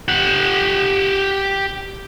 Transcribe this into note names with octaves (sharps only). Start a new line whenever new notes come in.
G4 F#5